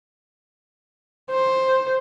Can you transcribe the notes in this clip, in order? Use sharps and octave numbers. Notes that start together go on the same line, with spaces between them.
C5